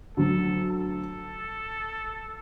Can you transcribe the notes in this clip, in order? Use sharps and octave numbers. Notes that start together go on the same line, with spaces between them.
D2 D3 F#3 A4
A4